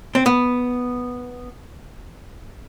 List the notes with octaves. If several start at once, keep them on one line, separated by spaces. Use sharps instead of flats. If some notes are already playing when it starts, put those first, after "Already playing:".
C4
B3